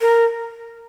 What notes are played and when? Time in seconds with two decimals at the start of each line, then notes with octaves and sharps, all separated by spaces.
0.01 A#4